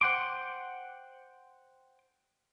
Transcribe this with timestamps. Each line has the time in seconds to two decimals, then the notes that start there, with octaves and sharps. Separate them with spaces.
0.01 C5 F#5 G5 C6 D6